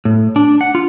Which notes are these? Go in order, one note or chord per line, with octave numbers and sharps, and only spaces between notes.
A2
D4
F#5
F4